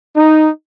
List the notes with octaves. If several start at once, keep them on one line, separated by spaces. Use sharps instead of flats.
D#4